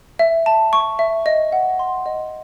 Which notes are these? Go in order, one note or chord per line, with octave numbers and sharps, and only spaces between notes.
E5
A5
C#6
E5
D#5
F#5
C6
D#5